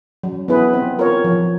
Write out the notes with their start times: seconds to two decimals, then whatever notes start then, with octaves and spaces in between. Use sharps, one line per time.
0.23 F#3
0.48 B3 E4 G#4 B4
0.73 C4
0.99 F4 A#4 C#5
1.24 F3